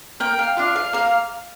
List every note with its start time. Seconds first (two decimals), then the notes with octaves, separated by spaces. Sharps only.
0.20 A#3 G5
0.39 F5
0.57 D4 F4 F5
0.76 F5
0.93 A#3 F5